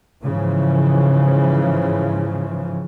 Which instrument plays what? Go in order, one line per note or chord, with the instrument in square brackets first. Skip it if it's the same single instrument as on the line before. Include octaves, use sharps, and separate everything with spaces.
[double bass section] G#2 C#3 E3 F3